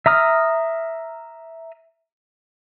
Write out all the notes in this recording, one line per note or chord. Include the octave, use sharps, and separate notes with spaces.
E5 A#5 D#6 F6